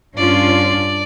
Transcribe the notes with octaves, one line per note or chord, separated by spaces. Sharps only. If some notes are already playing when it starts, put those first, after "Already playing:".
G2 C#4 D4 F4 D5